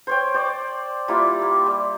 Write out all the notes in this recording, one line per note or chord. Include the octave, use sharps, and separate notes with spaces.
C5 C#5 G5
C5 D5
G3 A#3 E4 F4
A#3
G3